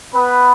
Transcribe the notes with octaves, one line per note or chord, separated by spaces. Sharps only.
B3 B4